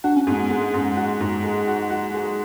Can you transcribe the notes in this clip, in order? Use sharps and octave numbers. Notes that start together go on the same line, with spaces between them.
D4 F#4
C#4
G#2 B3
C#4
G#3
G#2
F#4
G#2
G#3
F#4
F#4
G#3